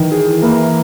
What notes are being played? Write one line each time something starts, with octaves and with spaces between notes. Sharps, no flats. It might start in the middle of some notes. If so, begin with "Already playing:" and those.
Already playing: D#3 E3
G#4
E3 A#3